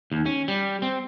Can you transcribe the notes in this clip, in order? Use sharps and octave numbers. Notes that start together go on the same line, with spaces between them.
D#2
C#4
G3
C4